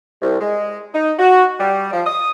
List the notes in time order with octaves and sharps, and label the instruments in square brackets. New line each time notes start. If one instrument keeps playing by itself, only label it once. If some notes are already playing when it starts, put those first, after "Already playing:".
[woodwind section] C2
G#3
D#4
F#4
G3
F3
D#6